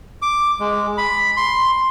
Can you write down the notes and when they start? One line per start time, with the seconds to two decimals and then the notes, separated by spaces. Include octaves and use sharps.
0.22 D6
0.60 G#3
0.97 B5
1.37 C6